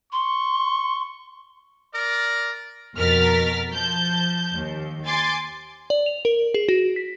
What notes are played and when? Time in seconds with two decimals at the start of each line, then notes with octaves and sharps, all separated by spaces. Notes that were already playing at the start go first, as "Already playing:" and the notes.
0.12 C6 C#6
1.93 A#4 D5
2.96 F2 B2 A#4 F6 A6 B6
3.70 F3 A5 G6
4.55 D#2
5.06 G#5 C6 D6 A6
5.90 D5
6.06 F7
6.25 A#4
6.54 G#4
6.69 F#4
6.96 B6